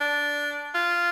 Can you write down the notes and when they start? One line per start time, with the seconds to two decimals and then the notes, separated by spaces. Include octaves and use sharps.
0.01 D4
0.74 F4